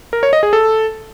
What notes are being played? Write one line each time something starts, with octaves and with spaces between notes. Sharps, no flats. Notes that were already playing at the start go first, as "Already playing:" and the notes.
A#4
C#5
D#5
G#4
A4